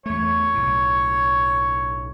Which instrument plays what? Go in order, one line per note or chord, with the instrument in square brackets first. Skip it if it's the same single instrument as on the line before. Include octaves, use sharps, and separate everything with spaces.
[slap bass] E2 A3 [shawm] C#5
[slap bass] B1 A2